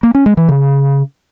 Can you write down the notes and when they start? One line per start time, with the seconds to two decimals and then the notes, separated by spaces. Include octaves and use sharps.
0.03 A#3
0.15 C#4
0.26 G#3
0.37 E3
0.49 C#3